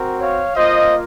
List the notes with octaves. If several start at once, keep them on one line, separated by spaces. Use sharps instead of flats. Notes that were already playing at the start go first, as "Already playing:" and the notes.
Already playing: C4 F#4 A#4
C#5 F5
A#3 F4 C5 D#5